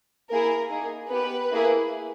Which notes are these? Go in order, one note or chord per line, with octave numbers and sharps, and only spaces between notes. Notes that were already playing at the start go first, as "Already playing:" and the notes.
A#3 E4 G#4 A#4
A#3 D#4 G#4
B3 G4 B4
A#3 E4 G#4